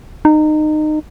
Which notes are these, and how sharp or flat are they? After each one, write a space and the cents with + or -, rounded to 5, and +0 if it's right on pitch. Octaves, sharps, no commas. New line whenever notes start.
D#4 -25